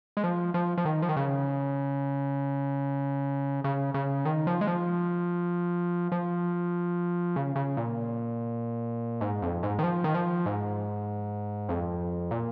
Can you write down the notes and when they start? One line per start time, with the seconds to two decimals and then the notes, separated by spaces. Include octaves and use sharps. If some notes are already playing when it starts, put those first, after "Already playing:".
0.17 G#3
0.23 F3
0.54 F3
0.77 F3
0.85 D#3
1.02 F3
1.09 D#3
1.16 C#3
3.64 C#3
3.94 C#3
4.25 D#3
4.47 F3
4.61 G#3
4.67 F3
6.12 F3
7.36 C#3
7.56 C#3
7.77 A#2
9.21 G#2
9.42 F2
9.63 G#2
9.79 D#3
9.83 F3
10.04 D#3
10.14 F3
10.46 G#2
11.69 F2
12.31 A#2